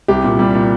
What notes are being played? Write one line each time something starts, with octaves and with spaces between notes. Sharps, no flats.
C2 G4
A#2
G3
A#2